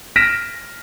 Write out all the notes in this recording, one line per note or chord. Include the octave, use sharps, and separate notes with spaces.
F6 A#6 B6 D7 E7